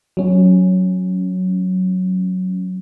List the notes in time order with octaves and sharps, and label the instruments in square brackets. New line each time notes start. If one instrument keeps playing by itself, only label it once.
[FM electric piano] F#3 C#4